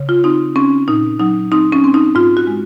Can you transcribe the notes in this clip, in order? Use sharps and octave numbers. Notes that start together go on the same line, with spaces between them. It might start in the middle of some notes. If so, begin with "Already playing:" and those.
Already playing: C#3
F4
C4 D#4
C4 C#4
A#2 D#4
F#3 D#4
C4 D#4
C#4
C4
D#4
G#2 F4
F#4
G#3